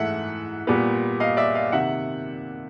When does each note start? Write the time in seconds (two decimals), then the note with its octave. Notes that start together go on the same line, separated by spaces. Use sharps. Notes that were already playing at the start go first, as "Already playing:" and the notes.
Already playing: G#2 E3 A3 E5 F#5
0.67 A#2 G3 B3
1.20 D#5 F5
1.37 D5 E5
1.55 D#5 F5
1.72 C3 D#3 E5 F#5